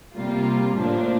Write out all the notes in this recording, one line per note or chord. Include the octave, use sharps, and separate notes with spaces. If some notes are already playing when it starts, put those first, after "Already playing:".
C3 G3 A#3 F4
A2 F3 A#3 D4